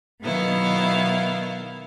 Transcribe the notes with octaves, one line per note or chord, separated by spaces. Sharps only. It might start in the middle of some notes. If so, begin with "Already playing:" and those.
B2 D#3 F#3 B3 E4 F5